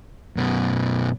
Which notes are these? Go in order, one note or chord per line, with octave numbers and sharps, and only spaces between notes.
F#2 B2